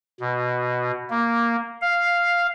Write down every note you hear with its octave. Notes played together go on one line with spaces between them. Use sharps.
B2
A#3
F5